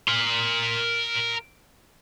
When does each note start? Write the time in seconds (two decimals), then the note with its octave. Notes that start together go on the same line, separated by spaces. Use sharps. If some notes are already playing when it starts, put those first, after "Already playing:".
0.08 A#4 C6